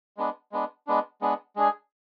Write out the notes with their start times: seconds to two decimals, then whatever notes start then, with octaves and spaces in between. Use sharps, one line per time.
0.17 G#3 B3 D4
0.52 G#3 B3 D4
0.87 G#3 B3 D4
1.21 G#3 B3 D4
1.56 G#3 D4 G#4